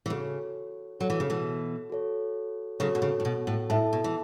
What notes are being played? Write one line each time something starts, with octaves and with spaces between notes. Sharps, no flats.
E3
C#3 F#4 A4 C#5
F#3 F#4 A4 C#5
E3
C#3
B2 E3
F#4 A4 C#5
C#3 F#3 F#4 A4 C#5
B2
C#3
A2
B2
A2
A2 E4 A4 E5 A5
B2
E3